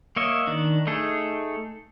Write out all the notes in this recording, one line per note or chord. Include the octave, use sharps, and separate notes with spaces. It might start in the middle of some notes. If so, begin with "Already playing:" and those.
A#3 C#5 D#5 E5
D#3 D4
A3 D#4 G#4 A4